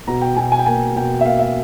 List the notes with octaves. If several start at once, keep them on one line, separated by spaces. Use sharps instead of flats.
B2 A#5
G5
B2 G#5
G#5
G5
A#3 G#5
B2 G5
E5
A#3 F5
E5